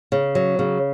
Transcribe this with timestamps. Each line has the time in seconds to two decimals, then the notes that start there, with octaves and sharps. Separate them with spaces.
0.12 C#3
0.35 F#3
0.59 C#3